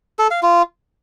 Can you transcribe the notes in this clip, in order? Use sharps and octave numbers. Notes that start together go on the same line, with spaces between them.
A4
F5
F4